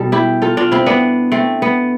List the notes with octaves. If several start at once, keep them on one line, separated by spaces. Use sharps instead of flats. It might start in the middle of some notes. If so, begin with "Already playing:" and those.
Already playing: B2 G3 A4
E4 G4
F4 A4
D4 F4
C4 E4
B3 D4
A3 C4
B3